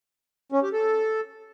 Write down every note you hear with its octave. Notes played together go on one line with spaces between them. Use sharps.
C#4
G4
A4